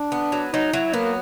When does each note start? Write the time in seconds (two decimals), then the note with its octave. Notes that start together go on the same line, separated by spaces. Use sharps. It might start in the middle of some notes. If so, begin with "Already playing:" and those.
Already playing: D4
0.12 B3
0.32 F#3
0.53 F#3 D#4
0.73 F#3 E4
0.94 A#3 B3